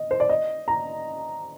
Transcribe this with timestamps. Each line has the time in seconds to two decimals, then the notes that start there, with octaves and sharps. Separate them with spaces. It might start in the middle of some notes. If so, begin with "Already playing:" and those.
Already playing: D#5
0.11 C5
0.20 D5
0.29 D#5
0.68 A#5